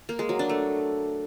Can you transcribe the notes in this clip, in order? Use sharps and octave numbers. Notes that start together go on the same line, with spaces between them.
A#3
G#3
F#3
D4
A3